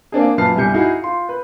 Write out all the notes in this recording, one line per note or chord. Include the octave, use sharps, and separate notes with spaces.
A#3 C4 D4 G#4
F#2 A#2 B4 A5 F6 C7
G1 C2 G4 G#5 G6 C#7
D#4 E4 F#4 G#4
F4 C6
B4